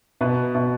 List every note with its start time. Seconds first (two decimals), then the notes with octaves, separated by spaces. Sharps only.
0.21 B2 B4
0.55 B2